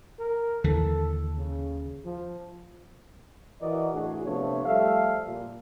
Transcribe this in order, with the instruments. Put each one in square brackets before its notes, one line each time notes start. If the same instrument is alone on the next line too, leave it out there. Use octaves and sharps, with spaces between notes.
[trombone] A#4
[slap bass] D#2 D3 E3 [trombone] A4
[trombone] C#3
F3
[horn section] E3 F#4 A#4 D5 D#5
A2 E3 D4 F#4 G#4
C3 F3 A3 B3 D4 C#5
F3 G3 A3 A4 E5 F5
A#2